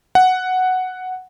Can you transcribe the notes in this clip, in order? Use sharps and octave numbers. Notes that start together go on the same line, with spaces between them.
F#5